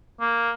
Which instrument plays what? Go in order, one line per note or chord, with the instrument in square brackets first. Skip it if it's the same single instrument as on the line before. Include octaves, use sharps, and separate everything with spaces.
[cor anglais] A#3